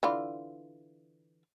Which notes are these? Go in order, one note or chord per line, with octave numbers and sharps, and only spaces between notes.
D3 E3 F4